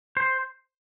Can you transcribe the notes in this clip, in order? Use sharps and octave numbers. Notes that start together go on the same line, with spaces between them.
C5